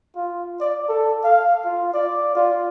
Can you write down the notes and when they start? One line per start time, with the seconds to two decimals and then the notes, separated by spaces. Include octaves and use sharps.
0.16 F4
0.60 D5
0.89 A4
1.24 F5
1.65 F4
1.94 D5
2.35 F4